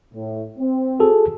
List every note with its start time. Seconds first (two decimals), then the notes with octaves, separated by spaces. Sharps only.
0.14 A2
0.59 C4
0.99 F#4 G#4 A4